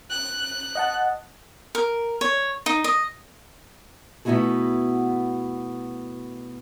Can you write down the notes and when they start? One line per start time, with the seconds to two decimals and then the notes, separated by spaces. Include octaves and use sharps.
0.10 F#6
0.75 D#5 F#5 A5
1.75 A#4
2.21 C#5
2.66 D#4
2.84 D#5
4.25 B2 A3 B3 E4 F#4 G#4